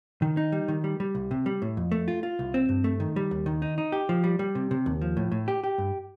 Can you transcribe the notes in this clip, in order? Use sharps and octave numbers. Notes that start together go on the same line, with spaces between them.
D#3
D#4
G3
D#3
G3
G3
C2
C3
G3
A2
F2
A3
F4
F4
C2
C4
G2
A3
D#3
G3
D#2
D#3
D#4
D#4
G4
F3
G3
G3
C3
C3
D#2
F3
A2
A2
G4
G4
G2